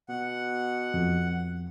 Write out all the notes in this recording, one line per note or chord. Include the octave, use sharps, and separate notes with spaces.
B2 F#5
F2